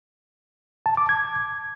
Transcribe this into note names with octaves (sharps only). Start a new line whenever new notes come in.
A5
D6
G#6